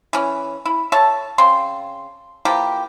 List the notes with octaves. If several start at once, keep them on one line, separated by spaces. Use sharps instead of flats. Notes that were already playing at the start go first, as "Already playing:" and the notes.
E3 C#4
E4
A4 C#5 E5 A5
C#3 C4 C6
E3 F3 A#3 G4